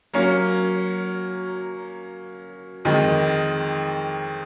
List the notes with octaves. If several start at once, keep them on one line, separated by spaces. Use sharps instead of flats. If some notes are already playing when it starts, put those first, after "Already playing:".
F#3 A#3 C#4
F2 D#3 G#3 D#4